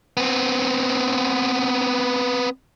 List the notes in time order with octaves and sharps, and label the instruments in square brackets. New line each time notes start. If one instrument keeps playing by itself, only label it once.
[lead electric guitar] B3 C4